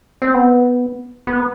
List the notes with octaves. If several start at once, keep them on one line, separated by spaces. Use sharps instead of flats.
C4
B3
B3